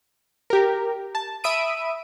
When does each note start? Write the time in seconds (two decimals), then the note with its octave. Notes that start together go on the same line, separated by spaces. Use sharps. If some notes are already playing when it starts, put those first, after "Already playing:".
0.50 G4 A#4
1.15 A5
1.44 E5 B5 D#6 D7 D#7